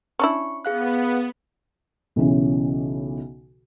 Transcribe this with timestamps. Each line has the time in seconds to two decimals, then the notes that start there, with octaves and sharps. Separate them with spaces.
0.19 C#4 D4 E4 C#6
0.65 B3 G#4 F5 F#6
2.16 B1 C#3 E3 C#4